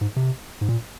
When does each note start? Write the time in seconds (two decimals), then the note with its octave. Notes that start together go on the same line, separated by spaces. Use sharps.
0.01 G#2
0.16 C3
0.61 G#2
0.69 A#2